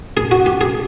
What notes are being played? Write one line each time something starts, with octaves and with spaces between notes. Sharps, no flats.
G#4
F#4
G4
G#4